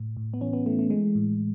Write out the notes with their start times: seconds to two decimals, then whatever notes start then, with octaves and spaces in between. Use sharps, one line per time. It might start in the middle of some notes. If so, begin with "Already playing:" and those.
Already playing: A2
0.17 A2
0.34 B3
0.41 E3 C#4
0.53 B3
0.66 E3 A3
0.79 A3
0.90 E3 G#3
1.15 A2